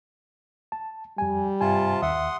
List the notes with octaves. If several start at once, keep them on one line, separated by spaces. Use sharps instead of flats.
A5
F2 G3 G#5
G2 C3 F4 G#5 A5
D#2 E5 F#5 C6 D#6